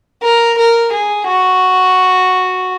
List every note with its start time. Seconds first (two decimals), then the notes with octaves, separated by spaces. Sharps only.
0.22 A#4
0.58 A#4
0.92 G#4
1.27 F#4